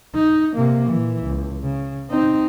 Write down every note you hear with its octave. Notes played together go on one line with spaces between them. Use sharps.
D#4
C3 A#3
A#2 E3
C#2
C#3
C4 D#4